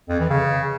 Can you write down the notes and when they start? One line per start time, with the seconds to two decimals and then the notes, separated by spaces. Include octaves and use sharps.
0.09 F2
0.20 E3
0.30 C#3